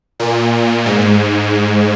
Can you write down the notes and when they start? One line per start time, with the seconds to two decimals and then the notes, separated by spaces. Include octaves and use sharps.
0.20 A#2
0.86 G#2